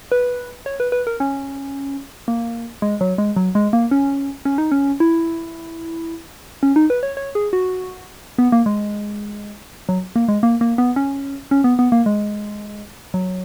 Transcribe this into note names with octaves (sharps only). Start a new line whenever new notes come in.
B4
C#5
B4
B4
A#4
C#4
A#3
G#3
F#3
G#3
F#3
G#3
A#3
C#4
C#4
D#4
C#4
E4
C#4
D#4
B4
C#5
C#5
G#4
F#4
B3
A#3
G#3
F#3
A#3
G#3
A#3
A#3
B3
C#4
C#4
B3
B3
A#3
G#3
F#3